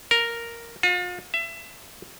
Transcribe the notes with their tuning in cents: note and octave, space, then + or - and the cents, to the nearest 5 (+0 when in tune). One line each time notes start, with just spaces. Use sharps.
A#4 +0
F4 +40
E5 +25